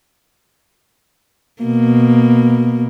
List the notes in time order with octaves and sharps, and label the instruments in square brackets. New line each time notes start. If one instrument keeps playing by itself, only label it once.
[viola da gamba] B2 A#3